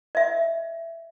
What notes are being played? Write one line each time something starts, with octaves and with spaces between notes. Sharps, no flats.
D#5 E5